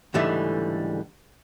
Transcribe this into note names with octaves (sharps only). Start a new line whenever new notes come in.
C#2 G#2 D3 E3 G3 A3